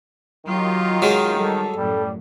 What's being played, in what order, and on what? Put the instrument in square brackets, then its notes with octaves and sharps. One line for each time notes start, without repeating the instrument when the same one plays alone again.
[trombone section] D#3 [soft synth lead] F#3 [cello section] F4 G4 D#5
[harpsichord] F#3 G#3 [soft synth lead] F6
[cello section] G3 [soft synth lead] A4
[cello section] F#2 A2 [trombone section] G3